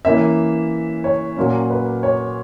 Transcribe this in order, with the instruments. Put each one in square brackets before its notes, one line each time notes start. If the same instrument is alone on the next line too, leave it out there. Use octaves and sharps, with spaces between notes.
[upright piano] E3 A#3 C#4 E5
C#5
A#2 F#3 A#3 C#4
B4
C#5